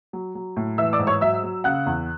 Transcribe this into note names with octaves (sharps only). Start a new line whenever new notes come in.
F#3
F#3
A2
E3 E5 E6
D5 D6
G#2
C#5 C#6
F#3 E5 E6
F#3
C#3 F#5 F#6
E2